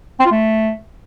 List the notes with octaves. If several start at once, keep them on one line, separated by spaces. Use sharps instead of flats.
C4
F4
A3